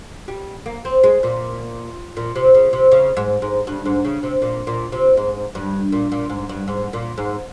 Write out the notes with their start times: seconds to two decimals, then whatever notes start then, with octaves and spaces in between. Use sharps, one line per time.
0.28 G3
0.66 A#3
0.85 C4
1.04 G#3
1.23 A#2
2.17 A#2
2.35 C3
2.54 C#3
2.73 C3
2.91 C#3
3.17 G#2
3.42 G#2
3.67 G2
3.86 G#2
4.05 C#3
4.23 C3
4.42 A#2
4.67 A#2
4.92 C3
5.17 G#2
5.55 G2
5.92 A#2
6.12 A#2
6.30 G#2
6.49 G2
6.68 G#2
6.93 A#2
7.18 G#2